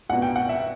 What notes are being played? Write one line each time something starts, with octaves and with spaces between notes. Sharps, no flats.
C2 B2 F#5
G5
F#5
E5